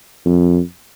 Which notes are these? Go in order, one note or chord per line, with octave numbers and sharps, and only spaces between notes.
F2